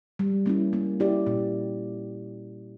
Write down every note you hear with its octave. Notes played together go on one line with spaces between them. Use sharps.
G3
A#3 C#4 E4
A#3
E4 G4 D5
A#2